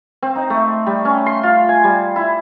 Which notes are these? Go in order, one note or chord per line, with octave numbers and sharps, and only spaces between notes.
C4
D#4
A3
G3
C#4
C6
F4
G#5
G3
E4